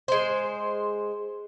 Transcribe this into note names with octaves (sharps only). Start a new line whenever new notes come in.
G#3 C5